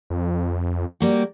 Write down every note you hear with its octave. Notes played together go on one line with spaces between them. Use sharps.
F2
G3 A#3 F#4